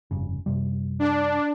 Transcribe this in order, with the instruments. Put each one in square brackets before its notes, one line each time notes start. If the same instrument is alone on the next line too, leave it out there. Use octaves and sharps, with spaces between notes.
[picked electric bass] F1 G2 C#3
F#2 C3 G3
[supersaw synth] D4